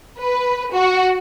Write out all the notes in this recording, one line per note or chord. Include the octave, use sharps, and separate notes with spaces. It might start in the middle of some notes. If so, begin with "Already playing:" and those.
B4
F#4